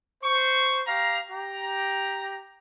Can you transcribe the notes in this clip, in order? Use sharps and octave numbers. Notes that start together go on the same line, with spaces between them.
C5 C#6
G4 F5 A#5
G4 A#5